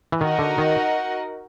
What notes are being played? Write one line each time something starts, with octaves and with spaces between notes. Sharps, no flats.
E3
D#3 D#4 F#4 A#4 D#5 F#5
D3
D#3